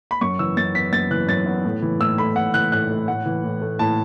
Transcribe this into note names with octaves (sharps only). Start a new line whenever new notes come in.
B5
F#2 C#6
E3 E6
F#2 A6
B3 B6
F#2 A6
E3 F#6
F#2 A6
B3
A2
E3
A2 E6
A3 B5
A2 F#5
E3 F#6
A2 F#6
A3
A2 F#5
E3
A2
A3
A2 A5